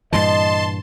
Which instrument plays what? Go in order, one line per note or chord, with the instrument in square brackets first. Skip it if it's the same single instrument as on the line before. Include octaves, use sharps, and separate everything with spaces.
[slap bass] G2 A#2 E3 [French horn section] D#5 [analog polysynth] A5 C6